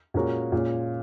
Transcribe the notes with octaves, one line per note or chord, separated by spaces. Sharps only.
A#2 G#3 C#4 F#4 A#4
A#2 G#3 C#4